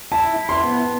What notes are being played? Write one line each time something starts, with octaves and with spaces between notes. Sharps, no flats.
E4 A5
E4
C6
B3